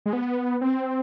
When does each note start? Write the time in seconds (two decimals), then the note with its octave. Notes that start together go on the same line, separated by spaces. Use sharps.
0.06 G#3
0.13 B3
0.61 C4